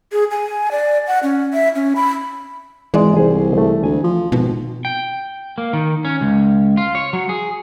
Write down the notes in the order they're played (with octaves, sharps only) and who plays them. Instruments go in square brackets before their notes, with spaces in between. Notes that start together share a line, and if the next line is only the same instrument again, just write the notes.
[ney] G#4
G#5
D5
F#5
C#4
E5
C#4
B5
[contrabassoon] G#1 [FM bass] E3 [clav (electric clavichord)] G#3 D5
[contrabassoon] C2 [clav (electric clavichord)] G#4 C5
[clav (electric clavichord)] A3
[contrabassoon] D2 [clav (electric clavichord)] G#5
[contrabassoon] F3
[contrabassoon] G#1 [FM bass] B2
[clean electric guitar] G5
A#3
D#3
C#4
C#2
F4
C#5
F#3
G#4